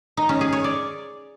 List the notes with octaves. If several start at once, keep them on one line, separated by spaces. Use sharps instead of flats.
D#4
C#4
G#4
C#5
D5